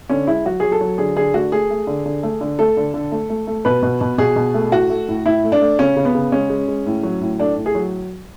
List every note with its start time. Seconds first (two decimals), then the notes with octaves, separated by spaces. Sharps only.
0.09 D3 C#4
0.27 G#3 E4
0.45 F#3 F#4
0.60 F#3 G#4
0.72 A4
0.81 F#3
0.98 D3 G#4
1.16 D3 G#4
1.34 A3 F#4
1.52 A3 G#4
1.70 A3
1.87 D3
2.06 D3
2.23 A3
2.41 D3
2.59 A3 A4
2.77 D3
2.94 D3
3.12 A3
3.30 A3
3.47 A3
3.65 B2 B4
3.83 B2
4.01 B2
4.18 B2 G#4
4.36 B2
4.54 A3
4.72 A2 F#4
4.90 A3
5.08 A2
5.26 A2 E4
5.44 A3
5.52 D4
5.61 A3
5.79 C#3 C#4
5.96 C#3
6.05 B3
6.15 C#3
6.32 G#3 C#4
6.50 G#3
6.68 G#3
6.86 A2
7.03 F#3
7.21 A2
7.39 A3 D4
7.56 A2
7.66 G#4
7.75 F#3